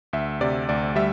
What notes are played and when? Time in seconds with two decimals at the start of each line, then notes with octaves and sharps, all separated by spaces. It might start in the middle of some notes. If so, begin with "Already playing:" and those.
0.13 D2 E5
0.41 C3 D5
0.69 D2 D5
0.96 G3 E5